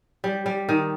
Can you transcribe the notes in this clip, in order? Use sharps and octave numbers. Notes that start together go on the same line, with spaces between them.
G3
G3
D#3